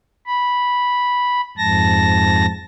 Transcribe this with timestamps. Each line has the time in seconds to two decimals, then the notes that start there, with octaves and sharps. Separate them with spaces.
0.26 B5
1.57 F2 G#2 A5 A#6